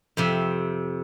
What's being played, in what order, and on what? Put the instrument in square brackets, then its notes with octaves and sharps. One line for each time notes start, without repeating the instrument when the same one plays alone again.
[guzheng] F2 C3 E5